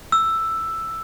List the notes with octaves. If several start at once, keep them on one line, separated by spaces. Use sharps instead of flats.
E6